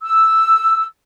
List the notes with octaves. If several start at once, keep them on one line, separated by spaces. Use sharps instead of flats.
E6